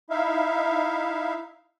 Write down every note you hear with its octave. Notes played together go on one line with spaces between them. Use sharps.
D#4 E4 E5 F5